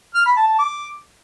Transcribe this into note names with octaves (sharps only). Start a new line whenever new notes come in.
F6
B5
A5
A5
D6